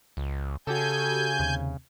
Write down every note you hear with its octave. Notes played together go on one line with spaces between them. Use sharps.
C#2
C#3 F#4 G4 A4 G#5 A5 G6
D#2 C3